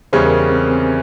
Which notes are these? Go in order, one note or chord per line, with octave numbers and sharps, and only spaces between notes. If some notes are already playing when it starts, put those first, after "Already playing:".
E2 C#3 G3 C#4 C5
A#4
G4
C4
C4